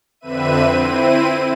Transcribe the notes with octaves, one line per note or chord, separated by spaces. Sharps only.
F2 D3 C4 B4 E5 D#7
C4 E4 D#7